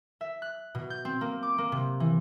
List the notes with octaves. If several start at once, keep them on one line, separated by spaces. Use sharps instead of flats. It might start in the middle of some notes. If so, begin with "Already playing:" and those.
E5
F#6
B2
G6
C4
A#3
D6
A#3
C3
E3